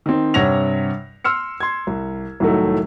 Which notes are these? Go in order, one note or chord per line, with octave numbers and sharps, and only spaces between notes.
D#3 C4
G2 C3 C#5 F#5 A#6 F7
C6 E6 F6 C#7
C6 G#6
C2
C2 A2 D#3 F#3 A3